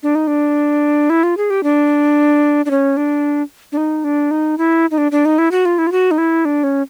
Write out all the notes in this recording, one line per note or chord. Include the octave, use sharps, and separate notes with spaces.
D4
D#4
D4
E4
F4
G#4
G4
D4
D4
C#4
D4
D4
D#4
D4
D#4
E4
D#4
D4
D4
D#4
E4
F#4
F4
E4
F4
F#4
D#4
E4
D4
C#4